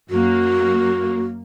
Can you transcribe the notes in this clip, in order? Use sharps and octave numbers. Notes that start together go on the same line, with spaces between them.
F#2 A#3 F#4